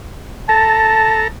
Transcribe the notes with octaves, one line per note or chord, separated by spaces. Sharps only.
A4 A5 A#5